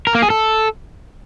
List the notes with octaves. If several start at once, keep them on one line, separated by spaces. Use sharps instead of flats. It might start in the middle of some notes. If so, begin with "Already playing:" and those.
A#4
A#3
G#4
A4